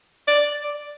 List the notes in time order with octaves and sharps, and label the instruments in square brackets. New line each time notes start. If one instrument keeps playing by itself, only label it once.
[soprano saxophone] D5
D5